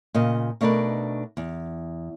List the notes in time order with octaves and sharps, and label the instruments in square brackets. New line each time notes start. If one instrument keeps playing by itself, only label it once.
[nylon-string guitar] A#2 C#3 D#5
B2 A3 D4 D#4 A#4 B4
E2